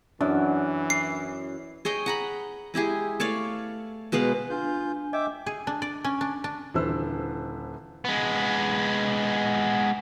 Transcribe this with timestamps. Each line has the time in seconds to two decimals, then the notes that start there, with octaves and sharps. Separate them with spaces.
0.21 F#2 E3 D4
0.90 C7
1.85 G#4 C#5 D#5 G5
2.06 F#5 A#5 B5
2.74 G#3 E4 G4 G#4
3.20 A3 C#5 D5 F5
4.12 B2 G#3 B4 F5
4.50 D4 F4 G#5 G6
5.13 D#5 E5 G5 D6
5.46 G#4
5.67 D4
5.82 D5
6.04 C#4
6.21 D4
6.44 D4
6.74 D#1 D3 E3 B4 C5 E6
8.05 G#3 B3